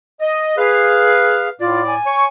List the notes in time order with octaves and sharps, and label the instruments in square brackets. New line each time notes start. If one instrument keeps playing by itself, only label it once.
[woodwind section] D#5
[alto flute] G#4 [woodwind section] B4 F5
[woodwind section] A2 D5 [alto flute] F4
[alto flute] G#5
[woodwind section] C#5 C#6